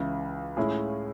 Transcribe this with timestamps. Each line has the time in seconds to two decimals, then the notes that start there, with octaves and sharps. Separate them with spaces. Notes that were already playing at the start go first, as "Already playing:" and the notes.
Already playing: C#2 C#3 E3
0.57 A2 G#3 C#4 E4 G#4